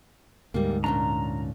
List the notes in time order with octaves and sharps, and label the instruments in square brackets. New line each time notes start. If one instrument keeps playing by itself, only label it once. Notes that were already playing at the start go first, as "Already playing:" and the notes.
[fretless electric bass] D2 G#2 [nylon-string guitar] G3 A#3
[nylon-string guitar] A#2 C#4 D4 [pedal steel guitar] A#5